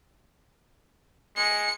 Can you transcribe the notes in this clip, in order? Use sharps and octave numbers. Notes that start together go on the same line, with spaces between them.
G#3 C#7